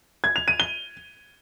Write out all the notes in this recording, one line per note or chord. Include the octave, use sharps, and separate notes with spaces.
G#6
F7
D#7
G7